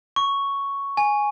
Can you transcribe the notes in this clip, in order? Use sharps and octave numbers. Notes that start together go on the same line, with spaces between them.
C#6
G#5